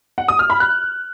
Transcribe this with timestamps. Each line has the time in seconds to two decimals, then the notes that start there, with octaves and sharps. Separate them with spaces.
0.18 F#5
0.28 D#6
0.39 F6
0.50 B5
0.60 F#6